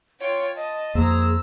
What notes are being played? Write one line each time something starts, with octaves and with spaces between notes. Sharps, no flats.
F4 C#5 G5
D#5 A5
F2 A#3 G#4 C5 A#5 E6